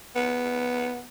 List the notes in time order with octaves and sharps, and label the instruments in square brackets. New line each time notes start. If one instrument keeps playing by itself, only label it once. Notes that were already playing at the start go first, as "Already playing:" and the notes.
[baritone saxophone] B3